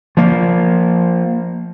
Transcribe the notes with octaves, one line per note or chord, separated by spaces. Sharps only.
F3 A#3